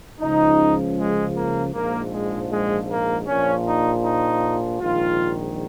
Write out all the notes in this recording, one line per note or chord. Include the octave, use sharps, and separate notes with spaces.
C#2 C#3 F3 D#4
G#3
A#3
A#1 G#2 F3 A#3
G#3
G#3
A#3
A#1 A#2 F3 C#4
D#4
D#4
A#1 G#2 D#3 F4